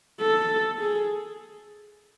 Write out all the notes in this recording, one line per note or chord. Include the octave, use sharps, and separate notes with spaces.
A4
G#4